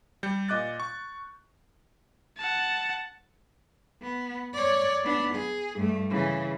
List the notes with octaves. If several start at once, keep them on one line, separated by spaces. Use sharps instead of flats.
G3 G6 C#7
A#2 D#5 D6 F#6 A6
C#6
F#5 A5
B3
C#5 D5
B3 D4
G#4
G2 A3
C#3 E3